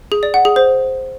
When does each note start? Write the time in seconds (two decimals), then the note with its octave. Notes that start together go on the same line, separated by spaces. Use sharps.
0.12 G#4
0.23 D5
0.34 F#5
0.45 G#4
0.56 C5